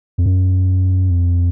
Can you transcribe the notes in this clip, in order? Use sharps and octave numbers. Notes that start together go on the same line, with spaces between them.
F2
F#2
F2